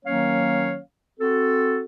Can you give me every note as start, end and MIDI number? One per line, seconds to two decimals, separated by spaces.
0.05 0.78 51
0.05 0.78 54
0.05 0.78 58
0.05 0.78 61
0.05 0.78 73
0.05 0.78 77
1.20 1.83 60
1.20 1.83 66
1.20 1.83 69